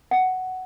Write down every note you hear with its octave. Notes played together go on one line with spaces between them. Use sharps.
F#5